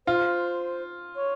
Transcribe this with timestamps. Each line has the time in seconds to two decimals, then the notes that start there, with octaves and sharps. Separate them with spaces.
0.07 F4 C5
1.16 C#5